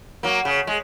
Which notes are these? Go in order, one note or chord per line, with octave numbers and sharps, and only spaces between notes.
F#3 A#3
C#3
G#3